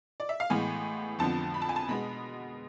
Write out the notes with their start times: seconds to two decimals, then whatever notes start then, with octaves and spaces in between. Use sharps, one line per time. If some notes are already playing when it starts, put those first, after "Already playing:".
0.20 D5
0.29 E5
0.40 F5
0.50 A2 E3 G#3 B3 G#5
1.19 F2 D3 F3 B3 A5
1.54 B5
1.62 A5
1.69 G#5
1.76 A5
1.88 B2 G#3 B3 B5